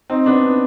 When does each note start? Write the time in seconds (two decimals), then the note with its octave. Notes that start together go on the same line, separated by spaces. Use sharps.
0.10 C4 D#4
0.26 B3 D4